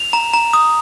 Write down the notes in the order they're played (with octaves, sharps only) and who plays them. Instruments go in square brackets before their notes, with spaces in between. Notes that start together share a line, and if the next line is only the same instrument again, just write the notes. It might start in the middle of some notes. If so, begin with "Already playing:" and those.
Already playing: [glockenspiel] F7
A#5
A#5
D#6